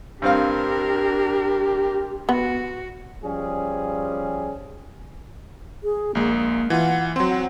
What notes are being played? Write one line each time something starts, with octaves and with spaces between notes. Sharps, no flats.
G2 C4 D4 G4 A#4 F5
B3 F#4
F3 G3 C#4 G#4
G#4
A#1 G#3 A#3
E3 F4 F#5
F#3 C4 C6
F#5